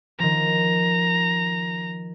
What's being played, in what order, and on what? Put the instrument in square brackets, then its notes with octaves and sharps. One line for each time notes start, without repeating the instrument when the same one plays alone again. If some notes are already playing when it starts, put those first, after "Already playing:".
[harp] D#3 F3 [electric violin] A#5